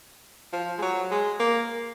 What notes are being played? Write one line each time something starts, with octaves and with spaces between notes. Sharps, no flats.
F3
G#3
F#3
G#3
A#3